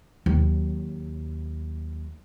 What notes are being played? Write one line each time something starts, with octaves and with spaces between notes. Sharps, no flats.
D#2 F#3